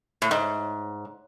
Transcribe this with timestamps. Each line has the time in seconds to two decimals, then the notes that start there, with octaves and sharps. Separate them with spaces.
0.22 A2
0.31 G#2